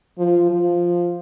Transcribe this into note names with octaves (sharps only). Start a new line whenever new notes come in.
F3
F3